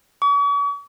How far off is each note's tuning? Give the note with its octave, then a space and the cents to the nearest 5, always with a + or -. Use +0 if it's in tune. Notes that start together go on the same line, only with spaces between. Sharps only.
C#6 +45